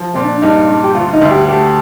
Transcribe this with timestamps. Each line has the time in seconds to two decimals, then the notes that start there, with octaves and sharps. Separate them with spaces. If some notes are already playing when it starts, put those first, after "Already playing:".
Already playing: F3
0.15 A#2 C4
0.24 D4
0.42 G2 D#4
0.69 G2
0.84 G4
0.95 D2 F4
1.13 D#4
1.21 D2
1.30 G4
1.49 A3 G4